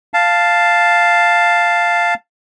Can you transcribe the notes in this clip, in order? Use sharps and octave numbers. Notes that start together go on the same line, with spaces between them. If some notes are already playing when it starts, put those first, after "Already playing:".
F5 A5